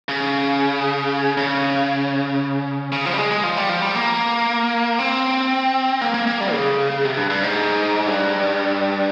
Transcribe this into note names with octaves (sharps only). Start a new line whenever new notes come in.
C#3
C#3
C#3
F3
G3
G#3
G#3
F3
G3
F3
G3
A#3
C4
A#3
A#3
A#3
G3
C#3
C3
G2
G2
G#2
G2